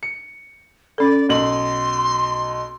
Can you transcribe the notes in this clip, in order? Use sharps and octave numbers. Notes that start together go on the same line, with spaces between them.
C#7
C#4 A4 D5
B1 C6 F#7